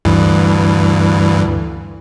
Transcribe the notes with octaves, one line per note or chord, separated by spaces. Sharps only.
D2 G2 E3